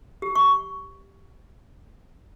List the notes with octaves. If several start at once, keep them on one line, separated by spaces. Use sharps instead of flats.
G4
C#6